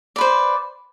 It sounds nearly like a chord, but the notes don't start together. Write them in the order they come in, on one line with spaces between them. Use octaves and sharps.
D5 B4 C5